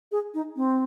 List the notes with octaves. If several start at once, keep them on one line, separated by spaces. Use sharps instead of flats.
G#4
D#4
C4